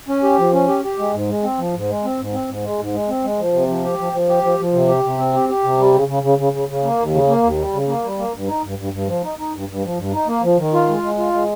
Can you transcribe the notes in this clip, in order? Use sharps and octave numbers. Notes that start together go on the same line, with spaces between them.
C#4
G4
F3
C#4
G4
G4
G#3
G#2
G#3
C4
F3
G#2
G#3
C4
G#2
C4
G#2
G#3
G#2
G#3
C4
G#3
F3
C3
F3
G4
F3
F3
G4
F3
F3
C3
G4
C3
C4
G4
G4
C3
G3
C#3
C#3
C#3
C#3
C#3
C#3
A#3
D#2
C#3
A#3
D#2
G3
C#3
A#3
G3
A#3
G2
D#4
G2
G2
G2
F3
D#4
D#4
G2
G2
F3
G2
D#4
A#3
F3
D#3
F4
G#3
G#3
F4
G#3